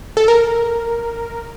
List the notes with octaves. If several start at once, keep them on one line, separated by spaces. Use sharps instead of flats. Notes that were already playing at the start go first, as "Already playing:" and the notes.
A4
A#4